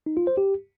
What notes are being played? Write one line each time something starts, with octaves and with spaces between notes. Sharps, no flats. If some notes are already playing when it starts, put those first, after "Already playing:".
D#4
F4
C5
G4